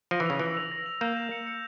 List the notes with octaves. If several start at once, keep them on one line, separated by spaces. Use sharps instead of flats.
F3 A#6
E3
C#3 F7
E3 E6
F7
A#6
F7
A#3 G6
E7
C#7
C#7